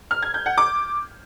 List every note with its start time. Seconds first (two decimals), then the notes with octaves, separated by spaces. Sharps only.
0.11 F6
0.22 G#6
0.34 G6
0.46 F#5
0.58 D6